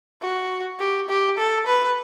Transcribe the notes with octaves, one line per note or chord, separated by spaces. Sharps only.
F#4
G4
G4
A4
B4